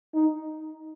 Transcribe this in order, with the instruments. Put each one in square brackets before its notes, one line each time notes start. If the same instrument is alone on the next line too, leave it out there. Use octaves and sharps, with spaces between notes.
[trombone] D#4